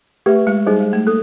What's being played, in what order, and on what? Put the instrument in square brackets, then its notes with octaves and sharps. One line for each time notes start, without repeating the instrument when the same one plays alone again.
[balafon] A3 [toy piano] G4 B4 E5
[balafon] G#3
[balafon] G3 [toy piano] D#4 G#4 C5
[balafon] G#3
A3
[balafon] A#3 [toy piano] A4